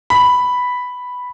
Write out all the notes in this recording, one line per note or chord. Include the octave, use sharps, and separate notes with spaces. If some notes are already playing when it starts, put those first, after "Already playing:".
B5